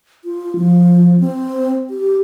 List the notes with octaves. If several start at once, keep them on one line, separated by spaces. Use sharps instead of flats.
F4
F3
C4
G4